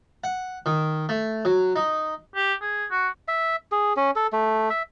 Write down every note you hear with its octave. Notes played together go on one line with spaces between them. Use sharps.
F#5
D#3
A3
F#3
D#4
G4
G#4
F#4
E5
G#4
C#4
A4
A3
E5